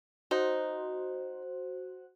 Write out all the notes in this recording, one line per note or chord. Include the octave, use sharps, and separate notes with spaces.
D#4 F#4 C5